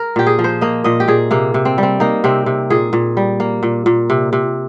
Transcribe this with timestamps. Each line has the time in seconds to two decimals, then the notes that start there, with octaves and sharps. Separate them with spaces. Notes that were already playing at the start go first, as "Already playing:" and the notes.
Already playing: A#4
0.16 A#2 G4
0.27 G#4
0.39 F3
0.44 C5
0.61 A#3 D#5
0.84 A#2 D#5
1.00 G4
1.08 A#2 G#4
1.31 C3 A#3
1.54 C3
1.65 C4
1.78 G3
1.83 C4
2.00 A#3 D#4
2.24 C3 C4
2.46 C3
2.70 A#2 G#4
2.93 A#2
3.17 G3
3.40 A#3
3.63 A#2
3.86 A#2
4.10 C3
4.33 C3